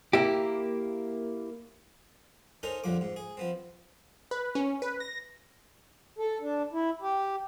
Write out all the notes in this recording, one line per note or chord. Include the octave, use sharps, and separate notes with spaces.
A#3 E4 G4
C#4 D#4 A4 A#4 C5
A#1 F2 D3 F3 D6
G#2
G#4
F3 B3 C4
B4
C#4
B4
A#6
A4
D4
E4
G4